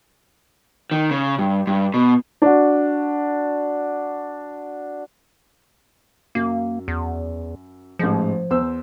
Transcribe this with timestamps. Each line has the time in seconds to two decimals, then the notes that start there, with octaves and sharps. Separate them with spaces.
0.91 D#3
1.11 C#3
1.39 G2
1.67 G2
1.94 B2
2.42 D4 F#4
6.35 F#2 A#3
6.88 E2
7.99 A1 G#2 F3 G#3
8.50 E2 C5 E6